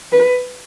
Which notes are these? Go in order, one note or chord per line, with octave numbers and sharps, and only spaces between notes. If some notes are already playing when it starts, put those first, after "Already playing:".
B4